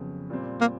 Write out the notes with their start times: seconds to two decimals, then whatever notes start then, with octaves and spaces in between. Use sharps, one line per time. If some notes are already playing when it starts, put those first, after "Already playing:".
Already playing: F2 C#3 F#3 B3
0.30 A#2 G3 C4
0.61 A#3